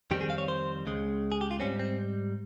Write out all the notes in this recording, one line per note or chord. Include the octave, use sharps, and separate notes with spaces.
F2 D#3 G3 C4 G4
G#4
F5
C#5
C5
C#2 C#3 G#3
G#4
G4
F4
G#2 G3 C4 C#4
C4